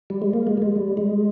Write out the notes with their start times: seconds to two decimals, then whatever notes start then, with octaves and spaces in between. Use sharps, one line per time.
0.10 G3
0.22 G#3
0.33 A#3
0.47 G#3
0.57 G3
0.62 G#3
0.76 G3
0.97 G#3